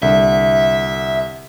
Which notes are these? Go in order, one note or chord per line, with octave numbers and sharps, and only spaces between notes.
C2 D3 E5